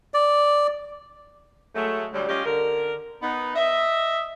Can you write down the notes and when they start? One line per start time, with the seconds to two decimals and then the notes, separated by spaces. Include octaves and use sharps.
0.14 D5
1.76 F#3 G#3 A3
2.14 D2 F#3 G3
2.29 C#4 F4 G4 D#5
2.46 D3 A#4
3.22 B3 D#4
3.56 D#5 E5